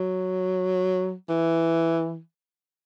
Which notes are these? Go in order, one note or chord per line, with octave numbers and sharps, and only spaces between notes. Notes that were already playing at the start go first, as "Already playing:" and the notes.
Already playing: F#3
E3